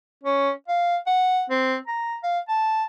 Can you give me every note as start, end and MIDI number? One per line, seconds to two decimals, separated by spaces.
0.23 0.51 61
0.68 0.97 77
1.07 1.44 78
1.50 1.76 60
1.87 2.17 82
2.23 2.39 77
2.49 2.84 81